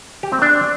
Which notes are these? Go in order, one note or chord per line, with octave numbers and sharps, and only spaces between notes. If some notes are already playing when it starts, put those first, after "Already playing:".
G4
C4
D4